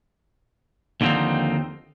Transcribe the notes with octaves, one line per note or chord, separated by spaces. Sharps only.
D#2 D3 F3 G3 C4 D#4